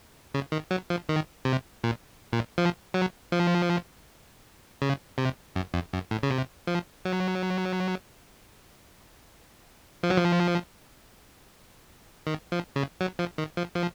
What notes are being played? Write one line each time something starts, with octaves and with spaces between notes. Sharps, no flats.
C#3
D#3
F#3
F3
D#3
C3
A#2
A#2
F3
F#3
F3
C#3
C3
F#2
F2
F#2
A2
C#3
C3
F3
F#3
F3
F#3
F3
D#3
F3
C#3
F#3
F3
D#3
F3
F3